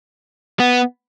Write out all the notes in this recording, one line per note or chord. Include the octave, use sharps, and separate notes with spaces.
B3